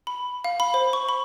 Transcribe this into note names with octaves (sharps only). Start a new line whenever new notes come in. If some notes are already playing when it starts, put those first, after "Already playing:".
B5
F5
B5
C5
C#6
B5